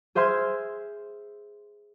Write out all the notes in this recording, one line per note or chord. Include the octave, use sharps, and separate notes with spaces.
G#4 C5 E5 C6 F6 G#6